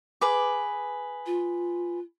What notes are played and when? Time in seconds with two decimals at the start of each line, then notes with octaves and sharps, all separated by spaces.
0.21 G#4 B4 D6
1.26 F4